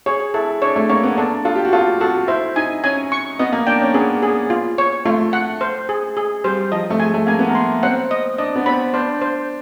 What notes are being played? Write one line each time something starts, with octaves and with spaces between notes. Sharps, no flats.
G#4 C#5
E4 A4
D4 C#5
A3
A#3 C#5
B3
D4 A4
F4 A4
G4
F#4
F4 A4
F#4 A4
E4 C5
D#4 G#5
C#4 G#5
C#6
B3 D#5
A#3
D4 G5
C#4
B3 G#4
G#4
F4
C#5
A3 F4
F#5
C5
G#4
G#4
G3 C5
F3 D#5
A3
G#3 G#5
A3
A#3 G#5
B3
A#3
C6
C4 F#5
D#5
D4 D#5
B3
C4 B5
D4 C5
C5